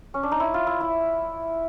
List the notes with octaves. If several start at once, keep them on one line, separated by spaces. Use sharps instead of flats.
C#4
D4
D#4
E4
F4
E4
E4